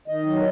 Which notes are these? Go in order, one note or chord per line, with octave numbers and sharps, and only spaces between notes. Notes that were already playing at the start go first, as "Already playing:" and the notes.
D#3 D#5
F#3